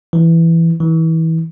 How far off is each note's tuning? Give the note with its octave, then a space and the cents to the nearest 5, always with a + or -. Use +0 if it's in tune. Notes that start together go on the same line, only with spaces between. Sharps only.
E3 +5
E3 -30